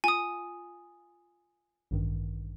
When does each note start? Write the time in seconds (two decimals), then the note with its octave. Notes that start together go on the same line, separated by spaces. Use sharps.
0.04 F4 G#5 D#6
1.91 A1 G2 D#3